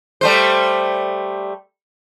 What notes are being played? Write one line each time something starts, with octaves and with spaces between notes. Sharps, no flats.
G3 A3 C5